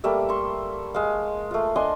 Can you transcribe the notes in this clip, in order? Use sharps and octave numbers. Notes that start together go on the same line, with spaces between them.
G3 A3 A#3 E5
C6 C#6
G#3 F5
A3 F4
D4 D#5 G#5 C6